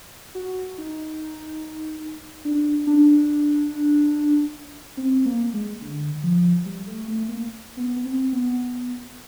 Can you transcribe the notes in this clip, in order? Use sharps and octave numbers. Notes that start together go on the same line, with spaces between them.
F#4
D#4
D4
D4
C4
A#3
G#3
D3
F3
G3
A3
A3
A#3
B3
B3
C4
B3